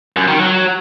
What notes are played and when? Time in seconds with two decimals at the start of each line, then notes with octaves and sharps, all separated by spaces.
0.16 F#2
0.28 D#3
0.39 F#3